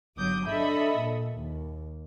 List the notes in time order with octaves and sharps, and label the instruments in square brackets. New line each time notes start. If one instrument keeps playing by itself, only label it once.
[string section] G1 F#3 D6 D#6 G6
D4 A4 D#5 E5 B5
A#2
D#2